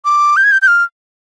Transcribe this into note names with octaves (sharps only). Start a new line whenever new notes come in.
D6
G6
G#6
G6
G6
F6